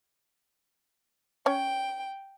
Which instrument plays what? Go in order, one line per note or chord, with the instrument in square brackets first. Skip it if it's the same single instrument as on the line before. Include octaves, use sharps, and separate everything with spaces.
[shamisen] C#4 C#5 [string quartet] G5